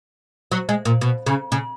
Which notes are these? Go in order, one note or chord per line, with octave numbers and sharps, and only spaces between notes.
F#3
G#3
A#2
B2
C#3
C#3